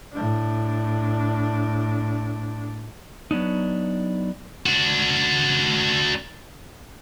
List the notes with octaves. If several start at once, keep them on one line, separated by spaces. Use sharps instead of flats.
A2 D4
F#3 B3 D4 D#4
D4 F#4